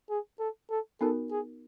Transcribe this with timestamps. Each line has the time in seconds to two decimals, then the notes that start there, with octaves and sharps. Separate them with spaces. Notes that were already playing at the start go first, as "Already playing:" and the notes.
0.10 G#4
0.39 A4
0.70 A4
1.01 B3 D#4 F#4 A4 A#4
1.31 G#4